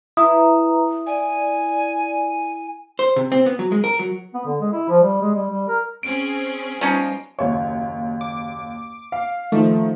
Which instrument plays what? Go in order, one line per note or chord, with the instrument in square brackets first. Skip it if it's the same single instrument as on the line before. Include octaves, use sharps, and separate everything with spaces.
[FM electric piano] E4 [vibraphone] B4 E5 A#5 [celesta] D#6
[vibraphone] D5 [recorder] G#5
[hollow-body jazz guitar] C5
C3
C4
B3
F#3
G#3
A#4
F#3
[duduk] B3
D3
G#3
E4
F3
G3
G#3
G3
G3
A#4
[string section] C4 C#4 G#4 [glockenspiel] D7
[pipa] F3 C#4 D#4 [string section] G3 B3 F4
[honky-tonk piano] F#1 D#2 C#5
[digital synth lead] D6
[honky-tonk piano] F5
[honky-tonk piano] D#3 F3 [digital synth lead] A3